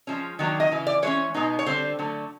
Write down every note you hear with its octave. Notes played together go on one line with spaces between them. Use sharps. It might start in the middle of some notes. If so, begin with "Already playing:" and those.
F3 G#3 C#4
D#3 F#3 A#3 D4
D#5
C#3 E3
D5
E3 G#3 C#4 C#5
B2 G#3 B3 D#4
C#5
D3 G3 C4 C5
D3 F#3 A3